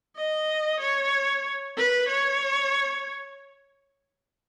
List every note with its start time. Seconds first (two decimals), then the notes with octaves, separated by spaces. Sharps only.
0.16 D#5
0.80 C#5
1.77 B4
2.09 C#5